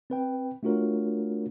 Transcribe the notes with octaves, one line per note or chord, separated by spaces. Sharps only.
C4 B4 G5
A3 D4 F4 F#4 A#4 C#5